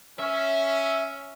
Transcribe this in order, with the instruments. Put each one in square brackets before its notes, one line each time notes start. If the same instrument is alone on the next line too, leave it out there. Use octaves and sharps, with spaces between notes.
[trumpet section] C#4 [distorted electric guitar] E5